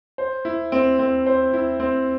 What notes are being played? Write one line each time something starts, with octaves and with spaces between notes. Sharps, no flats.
C5
E4
C4
C4
C5
E4
C4